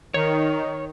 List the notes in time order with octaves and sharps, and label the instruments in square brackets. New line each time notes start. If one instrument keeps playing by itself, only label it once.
[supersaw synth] D#3 [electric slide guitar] C#5